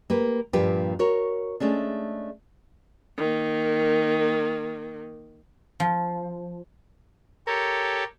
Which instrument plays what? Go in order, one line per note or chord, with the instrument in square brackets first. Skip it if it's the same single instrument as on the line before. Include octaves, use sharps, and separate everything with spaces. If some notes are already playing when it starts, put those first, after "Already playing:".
[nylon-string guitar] A#3 G4 B4
G2 A#2 F3 G4 B4
F#4 A#4 C#5
G#3 A3 C#4 D4
[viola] D#3 A#3
[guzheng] F3
[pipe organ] G4 A4 C#5 [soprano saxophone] A#4